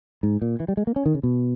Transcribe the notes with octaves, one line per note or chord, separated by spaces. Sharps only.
G#2
A#2
E3
G3
G#3
A#3
C#4
D#3
C#3
B2